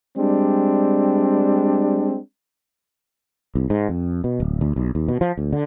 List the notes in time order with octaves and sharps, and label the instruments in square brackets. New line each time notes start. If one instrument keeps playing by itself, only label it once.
[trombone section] G3 G#3 C4 D4
[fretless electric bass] C2
G#2
F2
B2
D1
D2
B1
D#2
B2
F3
D2
D3